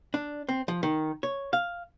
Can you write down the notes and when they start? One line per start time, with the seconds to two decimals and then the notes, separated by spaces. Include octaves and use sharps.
0.14 D4
0.49 C4
0.68 F3
0.83 D#3
1.23 C#5
1.53 F5